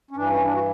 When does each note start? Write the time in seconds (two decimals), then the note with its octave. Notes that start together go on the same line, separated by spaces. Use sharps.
0.11 C#4
0.16 G2 E3 D4
0.30 C#4
0.44 D4
0.54 F#4